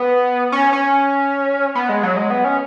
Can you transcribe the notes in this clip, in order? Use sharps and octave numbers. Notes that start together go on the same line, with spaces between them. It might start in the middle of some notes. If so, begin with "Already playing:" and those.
Already playing: B3
C#4
C#4
B3
G#3
F#3
G#3
B3
C#4